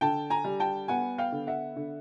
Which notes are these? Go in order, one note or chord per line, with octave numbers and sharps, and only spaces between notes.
D3 G5 A5
G#5 A#5
G3
G5 A5
B3 F#5 G#5
F5 G5
D3
E5 F#5
D3